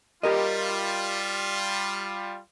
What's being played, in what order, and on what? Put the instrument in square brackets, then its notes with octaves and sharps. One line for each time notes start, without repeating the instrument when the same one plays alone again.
[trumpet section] G3 F4 [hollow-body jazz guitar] G4 A#4 D#5